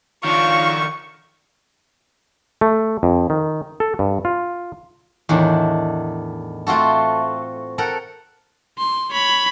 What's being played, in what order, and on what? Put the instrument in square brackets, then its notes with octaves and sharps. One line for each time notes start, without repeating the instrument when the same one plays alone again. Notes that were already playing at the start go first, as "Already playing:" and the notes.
[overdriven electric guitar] D#3 D4 [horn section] F4 C#5 F5 [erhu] C#6
[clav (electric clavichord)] A3
F2
D#3
A4
G2
F4
[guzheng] E2 A2 D#3 D4
A3 C4 F4 F#4 A4
A4 A#4 F#5 G5
[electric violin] C6
C#5 B5